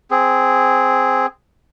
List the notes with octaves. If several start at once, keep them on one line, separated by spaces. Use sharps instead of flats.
C4 G#4